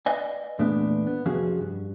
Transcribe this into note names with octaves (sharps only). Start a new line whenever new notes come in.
B4 D5 D#5 F5 G#5
E2 A#2 A3 B3 D4
B3
C2 F2 F3 C#4 F#4 G#4
G2